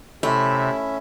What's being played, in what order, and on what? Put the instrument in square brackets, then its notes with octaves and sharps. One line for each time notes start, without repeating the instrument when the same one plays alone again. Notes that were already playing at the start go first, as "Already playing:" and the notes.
[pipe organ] C3 [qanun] A3 [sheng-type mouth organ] C#4 E5 [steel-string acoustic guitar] E4